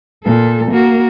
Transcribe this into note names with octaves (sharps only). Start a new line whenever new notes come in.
A#2 A4
A#3 F#4